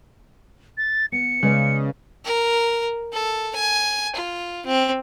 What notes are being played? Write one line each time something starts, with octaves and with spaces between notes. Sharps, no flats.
A6
B3 C#7
C#3 G#3 B4 D5
A#4
A4
G#5
F4
C4